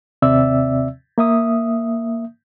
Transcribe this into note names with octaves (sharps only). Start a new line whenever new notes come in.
D#2 C3 C4 D5 E5 E6
A#3 E5 D#6